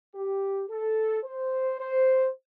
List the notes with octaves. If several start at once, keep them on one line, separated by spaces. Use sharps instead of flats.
G4
A4
C5
C5